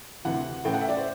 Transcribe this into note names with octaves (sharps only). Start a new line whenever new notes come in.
D2 C3 E3 F#5
A1 A2 E3 A3 G5
F#5
E5
D5
C5